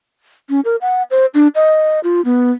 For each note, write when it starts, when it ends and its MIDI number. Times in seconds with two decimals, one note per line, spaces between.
0.50 0.60 61
0.65 0.76 70
0.81 1.03 78
1.11 1.26 72
1.34 1.48 62
1.55 2.00 75
2.04 2.21 65
2.25 2.51 59